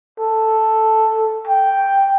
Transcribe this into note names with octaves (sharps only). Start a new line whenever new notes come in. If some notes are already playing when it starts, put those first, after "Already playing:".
A4
G5